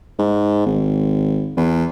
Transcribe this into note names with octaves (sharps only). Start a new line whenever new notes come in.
G#2
G#1
E2